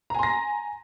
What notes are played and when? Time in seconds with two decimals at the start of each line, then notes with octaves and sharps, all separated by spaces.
0.10 A#5
0.15 G#5
0.19 C6
0.23 A#6